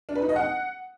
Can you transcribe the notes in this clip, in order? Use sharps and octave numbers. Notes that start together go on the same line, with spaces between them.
D4
B4
D#4
D#5
F#5